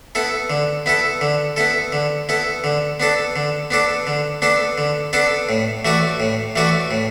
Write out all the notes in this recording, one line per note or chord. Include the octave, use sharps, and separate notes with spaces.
B3 E4 A4
D3
B3 E4 A4
D3
B3 E4 A4
D3
B3 E4 A4
D3
B3 D4 A4 D5
D3
B3 D4 A4 D5
D3
B3 D4 A4 D5
D3
B3 D4 A4 D5
A2
E3 A3 F#4 D5
A2
E3 A3 F#4 D5
A2